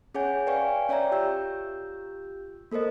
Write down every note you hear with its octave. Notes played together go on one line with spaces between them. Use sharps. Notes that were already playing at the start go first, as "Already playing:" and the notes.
C#4 G#4 C#5 F#5 G#5 G6
B4 D5 F5 G5 G#5 C#6
C#4 C#5 D5 E5 G5 A#5
F4 G4 E6 G6
A#3 A4 A#4 C5 D#5